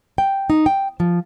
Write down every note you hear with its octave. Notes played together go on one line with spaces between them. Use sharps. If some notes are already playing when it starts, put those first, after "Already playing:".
G5
D#4
G5
F3